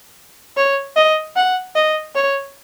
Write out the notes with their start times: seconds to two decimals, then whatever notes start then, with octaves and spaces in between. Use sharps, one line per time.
0.57 C#5
0.96 D#5
1.36 F#5
1.76 D#5
2.15 C#5